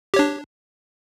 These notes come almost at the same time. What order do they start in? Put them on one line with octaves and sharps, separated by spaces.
G4 C#5 D4